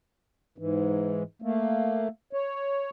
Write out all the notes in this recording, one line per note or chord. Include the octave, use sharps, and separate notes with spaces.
G#2 E3
A3 A#3
C#5